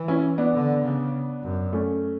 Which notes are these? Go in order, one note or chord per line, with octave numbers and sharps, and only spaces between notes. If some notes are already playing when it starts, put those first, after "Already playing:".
Already playing: E3
C#4 E4
B3 D4
D3
C#3
F#2
A3 C#4